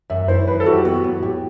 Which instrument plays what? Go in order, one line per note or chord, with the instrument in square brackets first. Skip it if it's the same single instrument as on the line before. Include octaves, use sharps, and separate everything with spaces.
[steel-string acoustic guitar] F#2 [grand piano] E5
[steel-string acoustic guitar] E4 [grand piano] C5
[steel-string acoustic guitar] F#3 [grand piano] B4
[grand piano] A4
[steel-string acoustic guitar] F#3 [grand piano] F#4
[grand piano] G4
[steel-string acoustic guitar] B3 [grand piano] F#4
[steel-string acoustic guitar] A2
[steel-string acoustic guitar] A2 [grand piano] G4